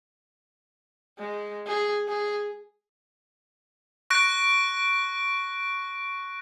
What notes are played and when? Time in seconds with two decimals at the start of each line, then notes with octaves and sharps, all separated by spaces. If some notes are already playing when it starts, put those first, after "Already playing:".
1.18 G#3
1.67 G#4
2.08 G#4
4.10 C#6 F#6 A#6 D7